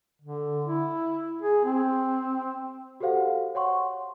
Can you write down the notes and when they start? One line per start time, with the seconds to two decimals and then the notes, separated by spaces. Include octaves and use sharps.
0.22 D3
0.65 E4
1.42 G#4
1.65 C4
3.00 F#4 G4 A4 C5 F5 F#5
3.55 C#5 F#5 C6 C#6